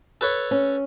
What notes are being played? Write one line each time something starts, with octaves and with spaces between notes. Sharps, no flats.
A4 B4 C#5
C#4